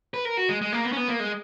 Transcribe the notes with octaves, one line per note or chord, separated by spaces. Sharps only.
B4
A#4
F#4
G#3
G#3
A#3
B3
C#4
B3
A#3
G#3